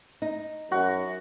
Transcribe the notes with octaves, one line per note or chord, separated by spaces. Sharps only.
D#4
F#2 F#4